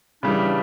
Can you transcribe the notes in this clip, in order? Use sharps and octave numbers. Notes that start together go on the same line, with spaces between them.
C#3 E3 G3 D4